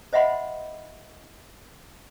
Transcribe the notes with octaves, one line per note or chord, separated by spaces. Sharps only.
C5 D#5 E5 F#5 B5 C6